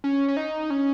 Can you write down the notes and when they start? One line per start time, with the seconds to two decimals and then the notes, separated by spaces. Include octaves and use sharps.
0.04 C#4
0.28 C#4
0.37 D#4
0.70 C#4